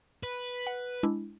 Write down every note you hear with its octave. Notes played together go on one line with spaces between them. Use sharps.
B4
F#5
G#3 D4 E4